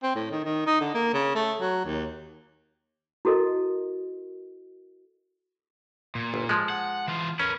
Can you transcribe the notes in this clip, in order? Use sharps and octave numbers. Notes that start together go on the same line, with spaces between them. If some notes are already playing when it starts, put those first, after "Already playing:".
C4
A2
D#3
D#3
D#4
D3
A#3
C#3
A3
F#3
D#2
E4 F#4 A4 A#4 D#5
A#2
G1
F3 G#3
F#5
E3 F4
C#4 A#4 B4